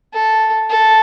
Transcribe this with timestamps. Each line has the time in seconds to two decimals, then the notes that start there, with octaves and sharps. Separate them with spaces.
0.14 A4
0.69 A4